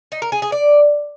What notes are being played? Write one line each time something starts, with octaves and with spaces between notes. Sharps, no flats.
D#4
A#4
G#4
G#4
D5